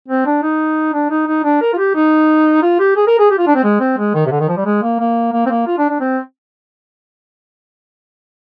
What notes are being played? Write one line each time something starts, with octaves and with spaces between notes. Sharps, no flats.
C4
D4
D#4
D4
D#4
D#4
D4
A#4
F4
G4
D#4
F4
G4
G#4
A#4
G#4
G4
F4
D4
C4
G#3
C4
G#3
D#3
C3
D3
D#3
F3
G3
G#3
A#3
A#3
A#3
C4
A#3
F4
D4
D4
C4